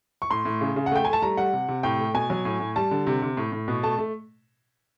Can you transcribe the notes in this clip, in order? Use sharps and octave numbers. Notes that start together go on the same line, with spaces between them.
C#6
A2 C6
A2
C#3
C#3
F#5
A3 G5
A3 G#5
A5
G3 A#5
G3 F#5
C3
C3
A2 G5
A3
B2 G#5
F#3
A2
A2
G3 A5
D3
C3
C3
A2
A2
B2
A3 A5
A3